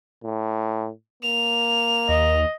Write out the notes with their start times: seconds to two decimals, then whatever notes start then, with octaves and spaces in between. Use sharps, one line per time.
0.24 A2
1.22 A#3 F7
2.09 D#2 D#5